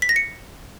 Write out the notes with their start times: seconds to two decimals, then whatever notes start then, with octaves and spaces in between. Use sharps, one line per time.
0.02 B6
0.09 A#6
0.16 C#7